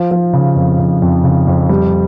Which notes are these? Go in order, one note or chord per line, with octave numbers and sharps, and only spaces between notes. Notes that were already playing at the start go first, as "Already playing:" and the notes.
Already playing: F3
F3
C#3
F2
F2
F2
C#3
F2
G3